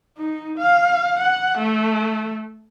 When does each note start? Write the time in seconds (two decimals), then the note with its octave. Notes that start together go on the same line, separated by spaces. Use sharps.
0.17 D#4
0.58 F5
1.19 F#5
1.58 A3